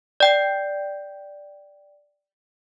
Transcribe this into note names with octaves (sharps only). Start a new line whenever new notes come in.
D5 G5 G6